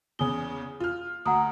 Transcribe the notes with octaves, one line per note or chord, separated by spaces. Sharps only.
E2 C#3 G#5 D#6 G7
F4 F6
D2 F#5 A#5 D#6